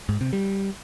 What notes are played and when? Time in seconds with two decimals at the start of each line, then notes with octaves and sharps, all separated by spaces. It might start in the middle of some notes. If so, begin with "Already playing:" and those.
0.09 G#2
0.21 C3
0.33 G3